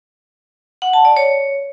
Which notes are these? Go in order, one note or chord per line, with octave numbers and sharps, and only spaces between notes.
F#5
A5
D5
C#5